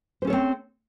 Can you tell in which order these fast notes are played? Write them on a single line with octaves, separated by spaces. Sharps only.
C5 C#4 A4 C#5 C4